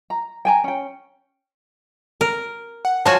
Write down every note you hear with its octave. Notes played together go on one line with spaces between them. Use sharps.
A#5
G5 G#5 A#5
C#4 G5
A#4
F#5
F3 F#4 C#5 G#5 A5 C6